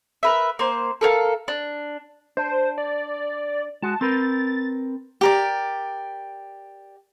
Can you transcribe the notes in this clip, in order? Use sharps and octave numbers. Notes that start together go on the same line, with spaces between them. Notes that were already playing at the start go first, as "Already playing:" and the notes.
A#4 B4 E5
A#3 C5
A4 A#4 C#5 F5
D4
D4 C5
D5
G#3 F#4 A5
C4 A#4 B4 A6
G4 A#4 D5